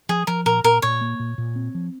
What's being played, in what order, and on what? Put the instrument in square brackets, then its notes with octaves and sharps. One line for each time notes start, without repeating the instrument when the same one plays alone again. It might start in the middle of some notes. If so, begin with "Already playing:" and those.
[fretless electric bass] F3 [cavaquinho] G#4
[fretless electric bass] F3 [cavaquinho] A#4
[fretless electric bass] A#2 [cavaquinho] A#4
[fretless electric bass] A#2 [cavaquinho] A#4
[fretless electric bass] A#2 [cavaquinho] C#5
[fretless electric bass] A#3
A#2
A#2
C4
F3